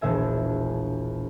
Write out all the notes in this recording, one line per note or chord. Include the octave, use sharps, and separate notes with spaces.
E1 A#1 E5 G#5